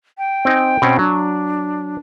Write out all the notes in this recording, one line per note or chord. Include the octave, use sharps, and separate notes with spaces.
G5
C4 D#4 G#5
B2 C4 C#4
F#3 D4